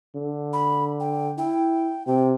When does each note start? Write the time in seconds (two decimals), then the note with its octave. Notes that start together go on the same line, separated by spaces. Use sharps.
0.15 D3
0.53 B5
1.00 G5
1.38 E4 G5
2.07 C3 G5